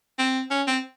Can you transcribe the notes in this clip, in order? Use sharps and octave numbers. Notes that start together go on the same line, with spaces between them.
C4
C#4
C4